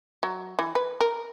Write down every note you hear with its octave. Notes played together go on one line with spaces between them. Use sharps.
F#3
E3
B4
A#4